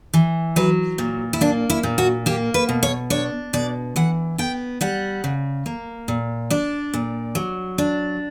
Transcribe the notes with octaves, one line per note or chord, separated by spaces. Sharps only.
E3
F#3 B4
A#2
E4
A#3 D4
E4
A#2
F#4
A#3 G4
B4
B2
C#5
D4 C#5
B2 D5
E3 F#5
B3 G5
G3 F#5
C#3
A#3
A#2
D4 D5
A#2
F#3
D4